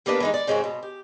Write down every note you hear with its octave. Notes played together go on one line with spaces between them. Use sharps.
G3 A#3 B3 D4 B4 F5
E3 G#3 D#4
D5
G#2 C#3 G#3 C4 C#4 F#4
B2
G4